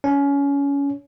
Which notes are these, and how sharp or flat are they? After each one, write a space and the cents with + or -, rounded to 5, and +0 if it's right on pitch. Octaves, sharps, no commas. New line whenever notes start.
C#4 +25